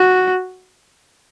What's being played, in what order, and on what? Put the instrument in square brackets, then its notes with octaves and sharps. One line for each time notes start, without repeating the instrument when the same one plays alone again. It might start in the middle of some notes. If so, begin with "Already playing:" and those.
Already playing: [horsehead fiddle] F#4